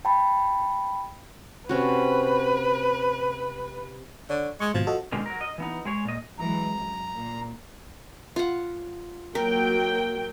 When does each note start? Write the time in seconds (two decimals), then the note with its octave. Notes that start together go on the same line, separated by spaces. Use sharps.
0.05 G5 A5 B5
1.69 C3 C#4 F#4 B4
4.30 D3 C#5
4.60 G#3 C#6
4.74 G#1 B2 F3 G#6
4.87 F#4 A4 D#5
5.12 B2 D3 D#3 G#3
5.26 F#3 A#4
5.41 D#5
5.58 E3 B3 D#4
5.85 G#3 G#4 C#5
6.05 A#2 D#5
6.39 E3 F#3 G#3 A#5
6.77 F#2
7.16 A#2
8.36 F4 F#5
9.35 F#3 A#3 A#4 G5